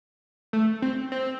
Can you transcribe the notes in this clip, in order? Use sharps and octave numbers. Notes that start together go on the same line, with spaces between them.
A3
C4
C4